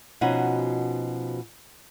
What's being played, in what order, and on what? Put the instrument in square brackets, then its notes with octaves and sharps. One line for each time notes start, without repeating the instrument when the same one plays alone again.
[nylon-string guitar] B2 F3 C#4 D#4 F#4